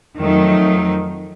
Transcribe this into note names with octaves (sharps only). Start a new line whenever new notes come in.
F2 D#3 F#3 A3 D#4